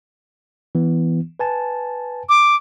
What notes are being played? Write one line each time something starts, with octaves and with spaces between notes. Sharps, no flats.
E3 B3
B4 G#5 A5
D6